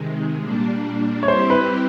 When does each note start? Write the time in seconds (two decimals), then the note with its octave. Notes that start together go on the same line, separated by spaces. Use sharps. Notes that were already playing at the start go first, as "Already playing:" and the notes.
Already playing: C3 D#3 G#3
0.41 A#2 G3 A#3 D4
1.23 C#5
1.28 G3 C4 E4 G4 C5
1.50 B4